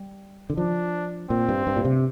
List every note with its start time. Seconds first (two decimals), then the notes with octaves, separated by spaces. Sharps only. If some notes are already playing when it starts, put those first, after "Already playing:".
Already playing: G3
0.50 D3
0.57 F3 D4
1.30 A#2 C4
1.49 G2
1.67 G2
1.77 A#2
1.85 C3